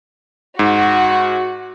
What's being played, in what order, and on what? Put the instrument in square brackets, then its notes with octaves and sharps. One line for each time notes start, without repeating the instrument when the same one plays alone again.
[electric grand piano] G#2 [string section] F#4